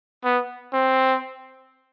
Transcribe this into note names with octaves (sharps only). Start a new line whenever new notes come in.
B3
C4